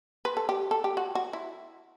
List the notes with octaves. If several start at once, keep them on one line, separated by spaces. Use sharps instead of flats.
B4
A4
G4
A4
G4
F#4
F#4
E4